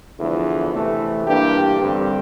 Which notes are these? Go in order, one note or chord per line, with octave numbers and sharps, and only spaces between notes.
E2 D3 F3 A3 E4
C3 E3 A3
G2 E3 A#3 D4 G4
G2 D3 G3 C4 G4